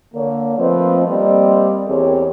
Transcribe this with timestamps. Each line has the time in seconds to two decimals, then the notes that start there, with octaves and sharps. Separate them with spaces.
0.14 D3 A#3 C#5
0.58 F3 A3 C4 B4 D#5
1.08 G3 A#3 C4 D5 D#5
1.88 E2 C4 G4 G#4 A#4 C#5